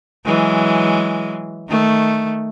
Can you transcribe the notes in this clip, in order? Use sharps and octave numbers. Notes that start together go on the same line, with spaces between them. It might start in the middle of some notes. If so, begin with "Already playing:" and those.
E3 F#3 G#3
D#3 A3